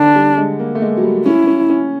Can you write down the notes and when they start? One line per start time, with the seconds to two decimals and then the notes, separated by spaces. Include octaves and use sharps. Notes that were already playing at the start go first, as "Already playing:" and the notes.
Already playing: D3 D4
0.15 G3
0.37 G#3
0.59 A#3
0.75 A3
0.82 G#3
0.97 F#3
1.03 G3
1.26 C#4 E4
1.47 C#4
1.70 C#4